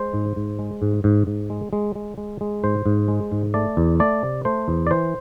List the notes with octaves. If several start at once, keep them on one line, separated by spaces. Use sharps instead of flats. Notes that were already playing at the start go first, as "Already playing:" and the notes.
Already playing: G#3 C5
G#2
G#2
G#3
G#2
G#2
G#2
G#3
G#3
G#3
G#3
G#3
G#2 C5
G#2
G#3
G#2
A3 D5
E2
A3 D5
C3
A3 C5
E2
D5
E3 C5